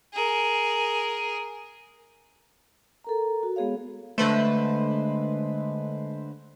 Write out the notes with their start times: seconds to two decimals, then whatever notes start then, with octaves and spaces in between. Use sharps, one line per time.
0.14 G#4 A#4
3.04 A4 A#4 A#5
3.43 F#4
3.56 G#3 B3 G#4 C#5 F5
4.18 D3 G#3 A3 B4 C5